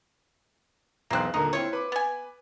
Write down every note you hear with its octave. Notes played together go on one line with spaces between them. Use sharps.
B1 E2 A#3 C4 F#6
D#1 D3 D#4 A#4
C4 E4 F4 C#5
B4 B5 D6
B3 G#5